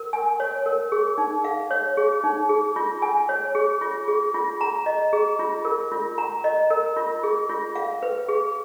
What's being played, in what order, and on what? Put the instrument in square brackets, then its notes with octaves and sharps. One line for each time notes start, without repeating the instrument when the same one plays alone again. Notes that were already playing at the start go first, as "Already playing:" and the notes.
Already playing: [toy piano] A#4
G#5
C#5
A#4
G#4
D#4
F5
C#5
G#4
D#4
G#4
F4
G#5
C#5
G#4
F4
G#4
F4
A#5
D#5
G#4
F4
A#4
F4
A#5
D#5
A#4
F4
G#4
F4
F5
B4
G#4